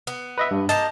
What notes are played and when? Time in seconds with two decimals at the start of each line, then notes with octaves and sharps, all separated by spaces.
0.07 B3
0.38 B4 D#5 E5
0.51 G2
0.69 A#3 G4 D#5 A5